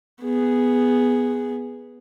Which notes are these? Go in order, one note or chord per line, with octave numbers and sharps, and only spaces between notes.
B3 G#4